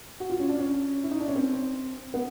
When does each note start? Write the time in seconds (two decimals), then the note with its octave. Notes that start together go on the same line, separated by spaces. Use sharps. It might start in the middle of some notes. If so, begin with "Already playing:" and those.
0.20 F#4
0.30 F4
0.40 C#4
0.49 D4
0.59 C#4
1.03 E4
1.11 D#4
1.20 D4
1.28 C#4
1.36 C4
2.14 B3